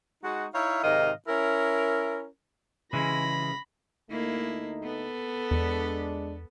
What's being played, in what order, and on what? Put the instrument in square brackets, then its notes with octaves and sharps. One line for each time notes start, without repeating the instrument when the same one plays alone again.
[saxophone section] G#3 D#4 F#4
D#4 E4 C#5 E5 F5
G#2 C3 D#3 D#5 F5
C#4 E4 A#4
[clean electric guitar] C#3 E3 G#3 [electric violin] B5 A#6
[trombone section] D2 A3 D#4 [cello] A#3 E4
[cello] B3 A4
[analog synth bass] E2 [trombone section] G#3 D4